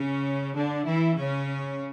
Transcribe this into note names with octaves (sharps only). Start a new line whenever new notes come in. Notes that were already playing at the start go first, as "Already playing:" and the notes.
Already playing: C#3 C#4
D3 D4
E3 E4
C#3 C#4